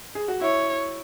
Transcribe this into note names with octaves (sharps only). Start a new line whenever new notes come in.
G#4
F#4
E4 C#5